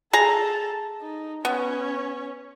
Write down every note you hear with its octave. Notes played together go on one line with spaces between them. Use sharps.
G#4 A4 A5 A#5
D#4
B3 C#4 C#5